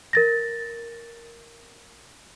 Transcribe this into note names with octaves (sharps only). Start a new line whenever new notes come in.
A#4 A6 A#6